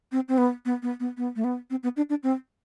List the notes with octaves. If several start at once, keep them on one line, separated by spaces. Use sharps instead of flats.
C4
C4
B3
B3
B3
B3
B3
A3
B3
C4
B3
D4
D4
C4